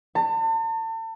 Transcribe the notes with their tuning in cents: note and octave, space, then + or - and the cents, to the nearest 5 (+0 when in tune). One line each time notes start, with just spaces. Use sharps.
A5 +40